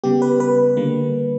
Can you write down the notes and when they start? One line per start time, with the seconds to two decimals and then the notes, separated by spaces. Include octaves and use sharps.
0.04 C#3 G3 B3 G4
0.22 B4
0.40 B4
0.77 D3 G3 A#3